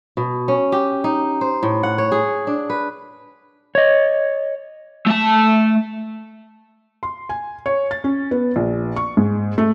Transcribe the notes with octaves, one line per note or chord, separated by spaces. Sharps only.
B2
C#4
G4
D#4
C5
A2
F#5
C#5
G#4
D4
B4
C#5 D#5
A3 A5
C6
G#5
C#5
A6
C#4
B3
A#1
C#6
G#2
A3